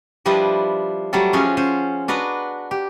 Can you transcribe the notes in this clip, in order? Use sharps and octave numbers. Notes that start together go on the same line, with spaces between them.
F3 G3 D4 E4 B4 D#5
F#3 G3 A3 A4
F3 C#4 F4 F#4 G#4
C#4 C5
D4 F#4 B4 D#5 A#5
G4